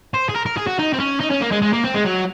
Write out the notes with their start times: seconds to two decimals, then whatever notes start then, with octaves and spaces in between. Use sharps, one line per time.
0.14 C5
0.29 G#4
0.36 A#4
0.46 A#4
0.57 G#4
0.67 F#4
0.79 D#4
0.93 C4
1.00 C#4
1.21 D#4
1.31 C#4
1.42 A#3
1.52 G#3
1.63 G#3
1.74 A#3
1.84 C4
1.95 G#3
2.05 F#3